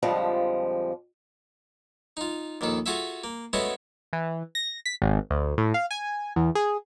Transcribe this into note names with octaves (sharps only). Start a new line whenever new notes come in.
F2 D3 F3 G3 G#3
D#4 F4
A#1 D#2 D#3 A4
F4 F#4 G#4 A4 E5
A#3
G#3 A3 B3 C#4 F#4 A4
E3
A#6
B6
G#1
D2
A2
F5
G#5
E2
G#4